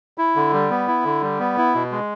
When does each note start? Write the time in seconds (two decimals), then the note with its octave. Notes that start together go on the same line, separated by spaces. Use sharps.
0.18 E4
0.36 D3
0.53 G3
0.70 B3
0.88 E4
1.05 D3
1.22 G3
1.40 B3
1.58 E4
1.74 B2
1.91 G#3